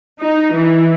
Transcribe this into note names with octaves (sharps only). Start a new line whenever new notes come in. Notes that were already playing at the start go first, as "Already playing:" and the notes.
D#4
E3